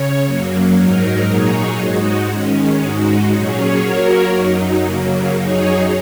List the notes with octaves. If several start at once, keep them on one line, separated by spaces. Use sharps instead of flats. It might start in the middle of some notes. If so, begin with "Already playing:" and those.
Already playing: C#3 C#5
F#2 F#3 A#3
G#2 F#3 D#4 A#4
A#2 F#3 D#4 G#4 C#5
G#2 G#3 D#4 F#4
D#3 G#3 C#4
G#2 G#3 D#4 F#4
A#2 F#3 C#4 G#4 C#5
F#3 A#3 F#4 A#4 C#5
F#2 F#3 D#4
C#3 F#3 A#3
F#2 F#3 D#4 G#4 C#5